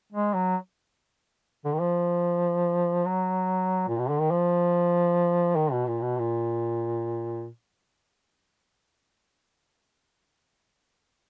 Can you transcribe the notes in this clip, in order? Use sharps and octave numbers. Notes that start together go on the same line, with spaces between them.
G#3
F#3
D3
D#3
F3
F#3
A#2
B2
D3
D#3
F3
D#3
B2
A#2
B2
A#2